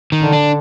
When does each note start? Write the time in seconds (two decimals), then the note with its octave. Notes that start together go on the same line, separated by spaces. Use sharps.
0.12 D#3
0.22 D3
0.32 D4